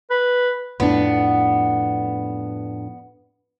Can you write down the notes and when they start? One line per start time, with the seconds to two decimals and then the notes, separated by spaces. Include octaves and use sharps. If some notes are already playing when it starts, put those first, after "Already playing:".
0.11 B4
0.80 F2 A2 B3 D4